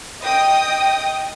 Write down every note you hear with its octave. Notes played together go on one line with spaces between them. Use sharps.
D#5 G5 D#6